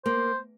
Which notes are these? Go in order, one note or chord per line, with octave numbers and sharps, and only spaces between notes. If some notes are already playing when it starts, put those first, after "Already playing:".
A#3 C5